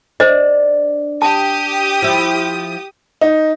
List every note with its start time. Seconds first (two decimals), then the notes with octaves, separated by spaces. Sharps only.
0.20 D4 C5 D#5
1.22 G4 A5 D#6
2.02 F3 E4
3.21 D#4